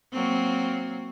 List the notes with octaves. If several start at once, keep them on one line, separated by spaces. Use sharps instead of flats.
F#3 A#3 C4